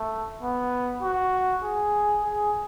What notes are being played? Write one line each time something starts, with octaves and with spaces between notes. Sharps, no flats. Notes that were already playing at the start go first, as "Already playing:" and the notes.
Already playing: A3
B3
F#4
G#4
G#4